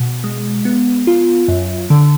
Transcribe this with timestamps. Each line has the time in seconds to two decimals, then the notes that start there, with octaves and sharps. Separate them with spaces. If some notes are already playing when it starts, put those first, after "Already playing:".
Already playing: B2
0.24 G#3
0.65 B3
1.07 F4
1.48 F#2
1.90 D3